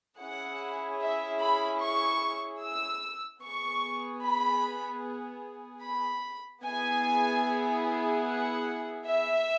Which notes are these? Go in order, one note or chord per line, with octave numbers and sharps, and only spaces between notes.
C#4 E4 G#4 F#5
E5
B5
C#6
E6
B3 G#4 C#6
B5
B5
B3 E4 G#4 G#5
F#5
E5